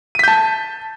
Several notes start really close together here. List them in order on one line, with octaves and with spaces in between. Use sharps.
D#7 B6 G6 A5